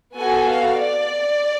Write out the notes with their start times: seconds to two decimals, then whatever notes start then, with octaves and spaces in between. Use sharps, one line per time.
0.19 B3 F#4 A4 G#5
0.50 F5
0.81 D5